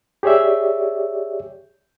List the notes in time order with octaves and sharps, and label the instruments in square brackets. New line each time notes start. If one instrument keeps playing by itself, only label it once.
[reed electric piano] G4 G#4 C#5 D5 E5